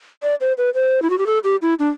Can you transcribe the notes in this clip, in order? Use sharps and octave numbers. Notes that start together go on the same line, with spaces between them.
D5
C5
B4
C5
E4
F#4
G4
A4
G4
E4
D4